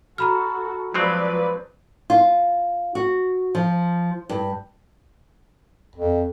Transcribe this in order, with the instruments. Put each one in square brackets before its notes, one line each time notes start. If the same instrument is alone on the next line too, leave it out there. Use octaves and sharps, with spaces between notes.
[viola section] F#4 A4 [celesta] A#5 B5 F6
[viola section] F3 B4 D5 [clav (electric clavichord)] F#3 G#3 C4
[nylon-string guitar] F4
F#4
F3
G2
[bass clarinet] F2